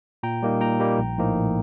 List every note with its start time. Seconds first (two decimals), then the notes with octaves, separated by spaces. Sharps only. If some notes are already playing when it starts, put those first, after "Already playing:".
0.23 A#2 G5 A#5
0.42 G3 A#3 D#4
0.61 A#2 G5 A#5
0.80 G3 A#3 D#4
0.98 A#1
1.18 A2 F3 A#3 D#4
1.36 A#1